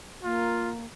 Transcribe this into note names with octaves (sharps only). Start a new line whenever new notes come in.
A#3 F4